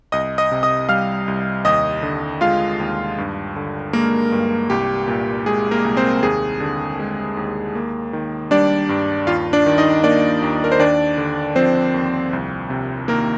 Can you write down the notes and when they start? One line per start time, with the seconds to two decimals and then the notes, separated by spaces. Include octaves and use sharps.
0.12 C2 D#5 D#6
0.38 D#5 D#6
0.51 C3
0.63 D#5 D#6
0.89 G3 F5 F6
1.28 C2
1.65 D#2 D#5 D#6
2.03 D3
2.41 G#3 F4 F5
2.80 D#2
3.18 G2
3.56 D3
3.93 G#3 A#3 A#4
4.32 G2
4.70 C2 G4
5.08 A#2
5.46 G#3 G#4
5.71 A#3 A#4
5.85 C2
5.97 C4 C5
6.22 D#2 G#4
6.60 D3
6.99 G#3
7.37 D#2
7.75 A#3
8.13 D#3
8.51 G3 D4 D5
8.89 G2
9.27 D#2 F4 F5
9.53 D4 D5
9.66 D#3
9.78 D#4 D#5
10.03 A#3 D4 D5
10.42 D#2
10.64 A#4
10.72 C5
10.79 D#2 D4 D5
11.18 D3
11.56 F3 C4 C5
11.94 D#2
12.33 C2
12.70 C3
13.08 D#3 A#3 A#4